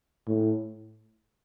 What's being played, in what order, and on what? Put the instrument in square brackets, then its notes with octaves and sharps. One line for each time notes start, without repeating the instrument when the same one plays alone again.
[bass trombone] A2